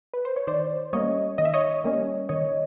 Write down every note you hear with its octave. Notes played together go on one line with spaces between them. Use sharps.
B4
C5
C#5
D#3 C5 D5
G3 A#3 C#4 C#5 D#5
D#3 D#5
E5
C#5 D#5
G3 A#3 C#4
D#3 C#5 D#5